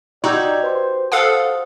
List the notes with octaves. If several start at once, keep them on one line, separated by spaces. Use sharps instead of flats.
D#4 F#4 G4 D5 D#5 E6 G#6
B4 C5 C6
A4 C5 F5 F#5 D#6